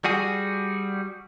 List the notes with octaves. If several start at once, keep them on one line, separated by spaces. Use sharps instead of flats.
G3 F#4 G#4